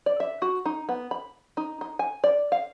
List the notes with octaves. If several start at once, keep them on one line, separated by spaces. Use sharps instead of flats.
D5
E5
F#4
D#4
B3
B5
D#4
D#4
G#5
D5
F5